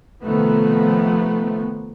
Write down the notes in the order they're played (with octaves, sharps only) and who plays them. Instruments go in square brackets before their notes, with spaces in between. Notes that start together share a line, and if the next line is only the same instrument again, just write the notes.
[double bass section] C3 D#3 F3 A3 B3